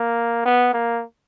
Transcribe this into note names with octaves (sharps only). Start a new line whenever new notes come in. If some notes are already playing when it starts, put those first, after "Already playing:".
Already playing: A#3
B3
A#3